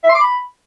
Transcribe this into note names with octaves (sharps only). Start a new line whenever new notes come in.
E5
C6
D6
B5